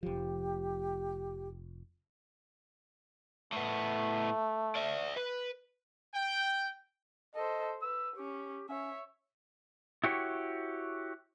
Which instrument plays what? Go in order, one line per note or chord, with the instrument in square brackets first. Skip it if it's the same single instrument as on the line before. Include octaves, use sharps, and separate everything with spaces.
[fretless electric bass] F1 F3 [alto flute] G4
[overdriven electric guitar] A2 B3 [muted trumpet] A3
[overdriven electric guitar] D5 E5
B4
[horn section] G5
[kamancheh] A4 C5 [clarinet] D#5
[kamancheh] B4 [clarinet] E6
[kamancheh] C#4 [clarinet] G4
[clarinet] C#4 [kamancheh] C#5 E5
[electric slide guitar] E4 F#4 G4 C#5